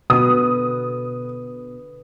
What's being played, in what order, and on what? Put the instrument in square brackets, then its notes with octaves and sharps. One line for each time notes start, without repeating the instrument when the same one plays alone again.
[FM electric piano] B2 [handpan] D3 B4 [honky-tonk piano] D#6